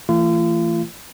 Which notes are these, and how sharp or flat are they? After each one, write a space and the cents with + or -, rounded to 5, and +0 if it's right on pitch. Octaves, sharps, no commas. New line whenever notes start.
E3 +0 A3 +30 F4 -40